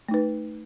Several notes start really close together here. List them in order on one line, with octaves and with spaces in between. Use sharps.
A3 D#4 B4